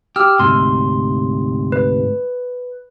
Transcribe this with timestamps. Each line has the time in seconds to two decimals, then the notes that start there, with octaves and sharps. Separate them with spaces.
0.16 G4 E6 F6
0.39 D2 G#2 C3 C6
1.72 B4